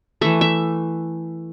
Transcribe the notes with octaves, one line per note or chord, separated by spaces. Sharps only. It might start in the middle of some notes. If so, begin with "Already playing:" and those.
E3 A3 E5
E5